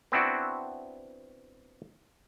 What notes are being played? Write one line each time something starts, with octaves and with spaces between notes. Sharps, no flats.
B3 C4 D4 E4 F#4